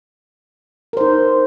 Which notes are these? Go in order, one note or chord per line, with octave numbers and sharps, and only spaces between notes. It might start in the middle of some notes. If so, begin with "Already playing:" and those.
D#4 A#4 C5